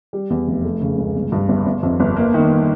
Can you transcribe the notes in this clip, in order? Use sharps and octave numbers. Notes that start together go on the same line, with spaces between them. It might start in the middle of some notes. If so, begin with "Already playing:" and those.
G3
E2
F1
A3
C#3
C#2
G1
G2
G1
G1
F2
G1
A#3
D#3